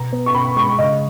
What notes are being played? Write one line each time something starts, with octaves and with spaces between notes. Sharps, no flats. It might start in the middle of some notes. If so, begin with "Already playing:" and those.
Already playing: B2 A#5
B3
C#6
B2 B5
G#3 C#6
C#3 D#5